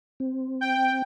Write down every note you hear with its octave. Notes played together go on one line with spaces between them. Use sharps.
C4
G5